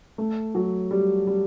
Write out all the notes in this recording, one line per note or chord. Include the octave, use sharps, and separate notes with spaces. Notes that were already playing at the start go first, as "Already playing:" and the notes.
A3
F#3
G3
G3